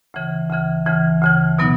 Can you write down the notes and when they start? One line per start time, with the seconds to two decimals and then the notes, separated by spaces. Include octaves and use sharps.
0.14 D2 C#3 E3
0.50 D2 C#3 E3
0.86 D2 C#3 E3
1.22 D2 C#3 E3
1.59 B2 F#3 B3 D#4